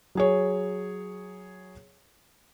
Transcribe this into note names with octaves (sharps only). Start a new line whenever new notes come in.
F#3 G#4 C#5